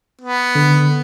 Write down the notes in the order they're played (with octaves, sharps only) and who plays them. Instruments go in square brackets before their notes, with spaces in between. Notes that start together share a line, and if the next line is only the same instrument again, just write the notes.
[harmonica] B3
[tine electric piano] D3